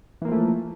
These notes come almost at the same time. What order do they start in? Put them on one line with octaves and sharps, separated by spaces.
E3 A#3 F3 A3